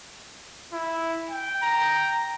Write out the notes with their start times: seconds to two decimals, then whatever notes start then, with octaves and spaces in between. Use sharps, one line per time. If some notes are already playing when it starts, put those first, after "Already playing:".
0.73 E4
1.30 G5
1.62 A#5